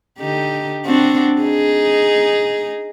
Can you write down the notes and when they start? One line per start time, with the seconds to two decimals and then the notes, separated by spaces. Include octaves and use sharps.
0.19 D3 D#4 G4
0.86 C4 D4 F#4
1.42 D#4 G#4